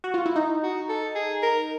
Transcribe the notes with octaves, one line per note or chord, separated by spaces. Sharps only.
F#4
F4
E4
D#4
F#4
A4
G#4
A#4